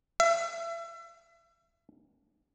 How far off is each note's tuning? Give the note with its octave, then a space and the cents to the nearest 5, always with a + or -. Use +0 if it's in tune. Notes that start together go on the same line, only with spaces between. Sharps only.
E5 +35